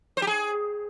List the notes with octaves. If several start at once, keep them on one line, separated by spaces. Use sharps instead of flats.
C5
G4
G#4